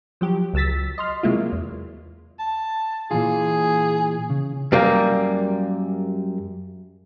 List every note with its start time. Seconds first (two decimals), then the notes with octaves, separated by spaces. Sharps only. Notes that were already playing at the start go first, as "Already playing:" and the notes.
0.21 F3 F#3 G4
0.54 C#2 F#3 E6 A6 B6
0.98 D#5 C6 F6
1.23 C3 F#3 G#3 A#3 E4 F4
1.52 E2
2.39 A5
3.11 A#2 E3 F4 G#4
4.30 C#3
4.72 F#2 G3 A#3